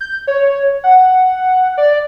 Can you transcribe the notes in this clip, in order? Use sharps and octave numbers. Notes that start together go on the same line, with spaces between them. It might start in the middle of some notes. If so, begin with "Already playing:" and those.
G6
C#5
F#5
D5